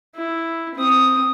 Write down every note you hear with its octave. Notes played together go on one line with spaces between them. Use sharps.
E4
C4 D#6